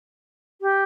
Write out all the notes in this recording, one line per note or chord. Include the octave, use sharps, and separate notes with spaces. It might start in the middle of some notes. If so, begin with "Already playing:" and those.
G4